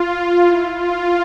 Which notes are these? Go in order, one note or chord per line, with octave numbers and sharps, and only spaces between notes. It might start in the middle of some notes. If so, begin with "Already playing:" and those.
Already playing: F4
E4
F4